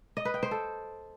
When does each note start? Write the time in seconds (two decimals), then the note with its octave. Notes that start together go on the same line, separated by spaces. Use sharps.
0.17 D#5
0.25 B4
0.34 G5
0.43 C5
0.51 A4